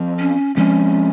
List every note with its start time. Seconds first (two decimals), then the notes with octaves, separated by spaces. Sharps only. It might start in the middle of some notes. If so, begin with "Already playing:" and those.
Already playing: F3 C4
0.19 C#4
0.56 F3 G#3 C4 C#4